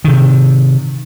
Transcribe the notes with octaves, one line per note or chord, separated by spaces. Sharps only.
C3 D#3